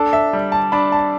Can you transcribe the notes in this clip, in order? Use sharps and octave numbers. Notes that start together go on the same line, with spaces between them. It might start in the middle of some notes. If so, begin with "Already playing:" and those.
Already playing: D4 A4
E5
G3
A5
D4 B5
A5